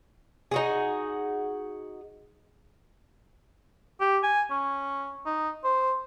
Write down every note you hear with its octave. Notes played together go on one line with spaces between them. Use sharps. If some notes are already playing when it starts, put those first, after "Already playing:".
D#4 F#4 G#4
G4
G#5
C#4
D#4
C5